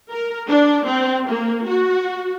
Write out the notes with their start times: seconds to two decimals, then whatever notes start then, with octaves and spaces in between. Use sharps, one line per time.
0.10 A#4
0.48 D4
0.86 C4
1.28 A#3
1.67 F#4